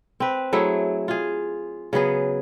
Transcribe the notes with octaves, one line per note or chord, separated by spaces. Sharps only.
C4 B4
F#3 A3 E4 G#4
F4 G#4
C#3 F#3 B3 G#4